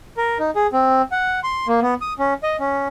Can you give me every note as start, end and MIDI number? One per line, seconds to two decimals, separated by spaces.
0.17 0.38 70
0.39 0.51 63
0.55 0.67 68
0.73 1.02 60
1.12 1.40 78
1.44 1.67 84
1.67 1.80 58
1.82 1.94 59
2.01 2.13 87
2.19 2.34 61
2.43 2.57 75
2.59 2.88 61